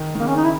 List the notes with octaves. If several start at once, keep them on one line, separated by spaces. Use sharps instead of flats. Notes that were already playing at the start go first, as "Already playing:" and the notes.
Already playing: D#3
D#3
C#3 A#3
C#4
D#4
E4